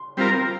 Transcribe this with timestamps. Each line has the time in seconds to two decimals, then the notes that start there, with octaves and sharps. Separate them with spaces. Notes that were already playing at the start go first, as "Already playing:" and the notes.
Already playing: C6
0.17 G3 C4 F4 A#4